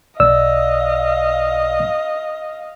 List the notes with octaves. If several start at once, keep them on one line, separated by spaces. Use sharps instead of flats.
B1 D5 D#5 F5 E6